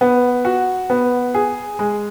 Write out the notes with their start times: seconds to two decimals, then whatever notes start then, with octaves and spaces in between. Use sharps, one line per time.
0.01 B3
0.45 F#4
0.90 B3
1.34 G#4
1.79 G#3